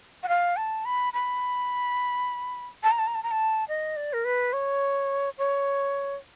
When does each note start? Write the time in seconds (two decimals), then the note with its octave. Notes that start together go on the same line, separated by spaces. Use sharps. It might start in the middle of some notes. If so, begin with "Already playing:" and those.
0.23 F#5
0.29 F5
0.57 A5
0.85 B5
1.13 B5
2.83 A5
2.91 A#5
2.99 A5
3.07 A#5
3.15 A5
3.23 A#5
3.31 A5
3.68 D#5
3.96 D5
4.13 A#4
4.25 B4
4.53 C#5
5.38 C#5